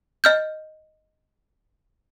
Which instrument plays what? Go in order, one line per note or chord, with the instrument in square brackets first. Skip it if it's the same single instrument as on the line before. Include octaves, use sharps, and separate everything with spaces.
[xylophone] D#5 F6 G6